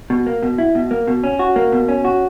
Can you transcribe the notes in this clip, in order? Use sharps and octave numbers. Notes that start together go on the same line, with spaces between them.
B2
A#3
B2
E4
B2
A#3
B2
C#4
F#4
A#3
B2
C#4
F#4